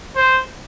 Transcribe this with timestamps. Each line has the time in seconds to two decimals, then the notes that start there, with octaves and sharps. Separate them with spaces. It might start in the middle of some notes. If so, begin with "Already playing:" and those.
0.16 C5